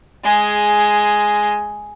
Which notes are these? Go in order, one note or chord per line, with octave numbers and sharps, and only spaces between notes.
G#3 G#4